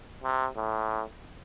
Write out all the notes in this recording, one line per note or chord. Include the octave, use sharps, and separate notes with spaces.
C3
A2